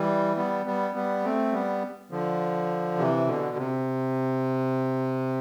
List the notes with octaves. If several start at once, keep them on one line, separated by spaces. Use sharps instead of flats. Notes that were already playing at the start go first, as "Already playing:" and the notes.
Already playing: E3 G3
G3 B3
G3 B3
G3 B3
A3 C4
G3 B3
D3 F3
C3 E3
B2 D3
C3